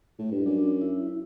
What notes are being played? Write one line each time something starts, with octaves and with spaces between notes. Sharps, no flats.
A2
G2
F#2 D4
E4